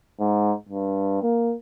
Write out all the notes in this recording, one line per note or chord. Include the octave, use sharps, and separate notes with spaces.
G#2
G2
A#3